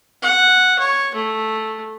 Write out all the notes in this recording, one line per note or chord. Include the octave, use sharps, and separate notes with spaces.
F#5
C#5
A3